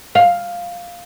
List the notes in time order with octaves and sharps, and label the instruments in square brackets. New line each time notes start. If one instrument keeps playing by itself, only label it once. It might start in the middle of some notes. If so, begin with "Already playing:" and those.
[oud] F5